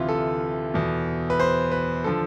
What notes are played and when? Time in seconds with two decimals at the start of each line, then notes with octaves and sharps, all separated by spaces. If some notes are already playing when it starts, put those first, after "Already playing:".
Already playing: D2 C3 E3 F4
0.09 A4
0.74 E2 B2
1.30 B4
1.39 C5
1.72 B4
2.04 D3 F3 A4